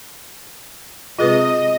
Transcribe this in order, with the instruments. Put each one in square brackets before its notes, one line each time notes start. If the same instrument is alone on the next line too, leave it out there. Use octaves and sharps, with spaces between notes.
[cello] C3 G#3 [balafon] F4 G#4 B4 [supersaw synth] D#5